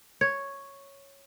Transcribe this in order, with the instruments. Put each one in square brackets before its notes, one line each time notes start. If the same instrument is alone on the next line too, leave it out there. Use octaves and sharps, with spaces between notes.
[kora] C#5